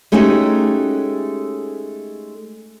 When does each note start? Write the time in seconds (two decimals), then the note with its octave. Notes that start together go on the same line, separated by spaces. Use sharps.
0.12 G#3 A3 C#4 D#4 F#4 G4